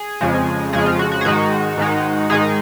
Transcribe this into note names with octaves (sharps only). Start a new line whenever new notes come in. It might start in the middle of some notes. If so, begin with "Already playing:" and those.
Already playing: G#4
F2 C#3 F3 G#3
F2 C#3 F3 G#3 G#4
F4
F#4
F#4
G#4
G#2 D#3 G#3 D#4 F#4
G#2 D#3 G#3 D#4
G#2 D#3 G#3 D#4 G#4